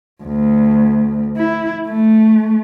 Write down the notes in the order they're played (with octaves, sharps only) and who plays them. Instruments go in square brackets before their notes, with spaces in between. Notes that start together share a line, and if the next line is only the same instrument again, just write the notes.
[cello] D2
E4
A3